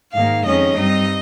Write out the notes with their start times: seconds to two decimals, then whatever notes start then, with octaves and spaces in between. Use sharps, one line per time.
0.13 G#2 D#3 A#3 F5
0.45 F2 D#3 G#3 C#4 D#5
0.76 G2 G3 C4 D#4